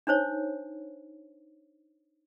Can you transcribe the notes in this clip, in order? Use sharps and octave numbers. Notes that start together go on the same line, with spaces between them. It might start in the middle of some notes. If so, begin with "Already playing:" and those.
D4 D#4 C5 C#5